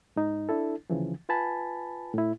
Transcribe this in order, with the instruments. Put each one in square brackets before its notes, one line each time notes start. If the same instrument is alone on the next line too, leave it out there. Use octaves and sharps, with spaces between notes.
[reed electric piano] G#2 D#4
D4 E4 A4
D2 C#3 E3 F3
F4 B4 G#5 A5 B5
A2 E4